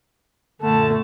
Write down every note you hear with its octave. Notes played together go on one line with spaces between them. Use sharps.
F#2 A#2 D3 A3 A5